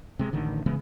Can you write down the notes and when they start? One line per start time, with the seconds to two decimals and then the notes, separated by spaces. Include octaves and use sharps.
0.19 C3 G#3
0.33 A1 D3 D#3
0.66 C#3 E3 G#3 B3